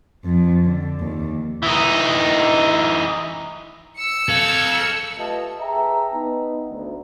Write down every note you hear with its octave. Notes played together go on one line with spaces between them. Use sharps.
F2
D3
D#2
E3 D#4
E6 C#7
A4 F5 G#6
A3 F4 G4 B4 D#5 A5
G#4 B4 E5 G5 A5 A#5
B3 D#4
D2